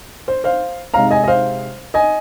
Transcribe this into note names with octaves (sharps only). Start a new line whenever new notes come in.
C5
C5 F5
C3 G#3 D#4 F5 A#5
D#5 G#5
D#5
C5 F5
D#5 G#5